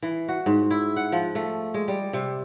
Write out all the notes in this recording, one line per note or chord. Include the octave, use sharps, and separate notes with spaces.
E3
F#4
G#2
E4
F#5
F3
A3
G#3
G3
C3